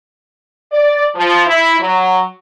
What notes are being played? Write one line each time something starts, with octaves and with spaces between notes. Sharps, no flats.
D5
F3
E4
F#3